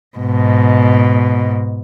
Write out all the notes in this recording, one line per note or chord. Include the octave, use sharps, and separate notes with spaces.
G#2 B2